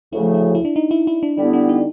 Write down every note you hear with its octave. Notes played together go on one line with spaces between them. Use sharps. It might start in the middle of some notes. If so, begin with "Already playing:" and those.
D2 C#3 F3 A3 E4
E4
E4
D4
D#4
E4
E4
D4
D3 G3 B3 D4 E4
D4
D#4